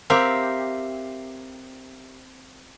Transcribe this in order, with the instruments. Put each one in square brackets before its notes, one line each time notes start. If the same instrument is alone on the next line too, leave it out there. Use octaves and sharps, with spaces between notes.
[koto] C4 G4 [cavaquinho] A#4 E5 F5